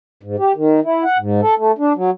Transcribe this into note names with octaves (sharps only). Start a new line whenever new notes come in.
G#2
G4
D#3
E4
F#5
G#2
A4
A3
D4
F#3